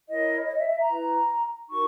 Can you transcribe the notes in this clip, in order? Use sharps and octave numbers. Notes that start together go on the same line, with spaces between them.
E4 A#4 C#5 D#5
C#5
D#5
E5
E5
A#5
E4 B4
D#4 F#4 A#4 C#6